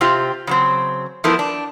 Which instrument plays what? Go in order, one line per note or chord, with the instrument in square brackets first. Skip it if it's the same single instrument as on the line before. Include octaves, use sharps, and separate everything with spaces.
[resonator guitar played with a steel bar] C3 C4 F4 G4
C#3 F#3 C4
F3 A3 B3 E4 A#4
D4